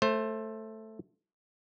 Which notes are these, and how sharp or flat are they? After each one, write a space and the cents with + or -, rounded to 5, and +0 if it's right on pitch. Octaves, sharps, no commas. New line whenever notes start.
A3 +0 C5 +25